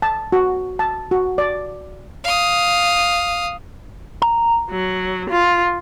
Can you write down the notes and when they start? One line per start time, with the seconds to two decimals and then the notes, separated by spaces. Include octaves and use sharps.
0.02 A5
0.32 F#4
0.79 A5
1.11 F#4
1.38 D5
2.24 F5 D#6
4.22 A#5
4.70 F#3
5.30 F4